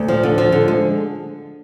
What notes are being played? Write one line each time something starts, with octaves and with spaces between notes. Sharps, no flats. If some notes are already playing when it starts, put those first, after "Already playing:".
Already playing: D2
F3
D3
F3
D3
G#3